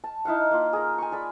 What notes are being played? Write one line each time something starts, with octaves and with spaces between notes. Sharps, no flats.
A5
D#4 E4 F5 F#5
A#3 F4
G#4 A#4
G#5 C#6
G#4 D5 B5